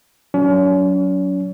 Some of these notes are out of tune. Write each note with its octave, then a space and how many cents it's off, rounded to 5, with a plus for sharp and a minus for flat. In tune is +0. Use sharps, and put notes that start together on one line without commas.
F#3 +0 C#4 +40